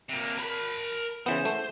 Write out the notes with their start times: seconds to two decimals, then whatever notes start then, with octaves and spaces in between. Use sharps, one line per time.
0.09 C3 A#3
0.39 A#4 B5
1.26 C#3 E3 B3 C5
1.45 A3